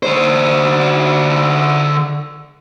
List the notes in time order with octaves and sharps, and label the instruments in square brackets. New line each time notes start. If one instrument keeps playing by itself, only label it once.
[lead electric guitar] D3 C5